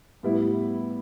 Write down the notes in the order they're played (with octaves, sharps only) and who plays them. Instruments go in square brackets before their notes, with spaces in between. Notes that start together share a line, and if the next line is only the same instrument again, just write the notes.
[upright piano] A2 G3 B3 E4